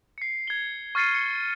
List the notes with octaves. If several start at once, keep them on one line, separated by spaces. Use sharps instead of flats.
C7 C#7
G#6 G7
C#6 F6 A6 C7 C#7 D#7
C#7